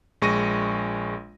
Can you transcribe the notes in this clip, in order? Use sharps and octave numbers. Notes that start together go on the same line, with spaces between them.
A#1 G#3 C#6 A#6 D#7